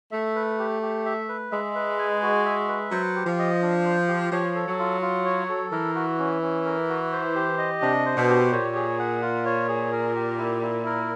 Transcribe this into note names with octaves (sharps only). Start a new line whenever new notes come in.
A3 E5
B4
G4
G4
E5
B4
G#3 E5
B4
G#5
F#4
E5
B4
F#3 C5
G4
F3
D#5
D4
C5
G4
F3 C#5
A4
F#3
F4
F4
C#5
A4
E3 A#4
F#4
C#4
C#4
A#4
F#4
C5
G4
D#5
C3 D4
C5
B2
G4
A#2 C#5
G#4
F#5
F4
C#5
G#4
A#4
G4
E4
E4
A#4